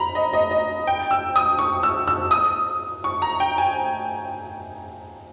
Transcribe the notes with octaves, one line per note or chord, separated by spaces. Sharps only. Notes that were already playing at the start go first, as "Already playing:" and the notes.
Already playing: A#5 B5
D#5
D#5
D#5
G5
E6
D#6
C#6
E6
E6
D#6
C#6
A#5
G5
G#5